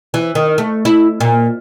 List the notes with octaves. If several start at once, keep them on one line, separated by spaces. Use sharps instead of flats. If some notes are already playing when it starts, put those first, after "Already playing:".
E3
D#3
A3
E4
A#2